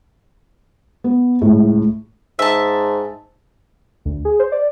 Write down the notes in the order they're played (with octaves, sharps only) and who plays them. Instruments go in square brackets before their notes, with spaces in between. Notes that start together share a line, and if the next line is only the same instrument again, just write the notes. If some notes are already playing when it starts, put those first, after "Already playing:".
[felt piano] B3
C#2 A2
[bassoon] G#2 [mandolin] E5 A5
[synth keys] D2
G#4
C5
D5